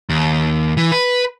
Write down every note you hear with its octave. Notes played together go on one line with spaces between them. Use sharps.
D#2
E3
B4